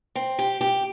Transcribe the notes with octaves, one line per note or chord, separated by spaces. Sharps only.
C4
G4
G4